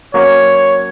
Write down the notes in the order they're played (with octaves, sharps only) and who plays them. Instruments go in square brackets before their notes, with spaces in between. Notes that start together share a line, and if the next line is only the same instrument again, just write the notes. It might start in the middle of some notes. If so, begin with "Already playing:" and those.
[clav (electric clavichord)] F#3 A#3 C#4 [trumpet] C#5